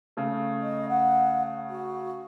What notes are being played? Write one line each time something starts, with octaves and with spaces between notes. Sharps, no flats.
C#3 A3
D#5
F#5
F#4